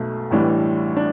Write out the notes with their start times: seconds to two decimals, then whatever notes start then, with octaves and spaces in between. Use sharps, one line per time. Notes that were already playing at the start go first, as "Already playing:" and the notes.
Already playing: B1 B2 A3
0.31 A1 A2 E3 G3 D4
0.97 D4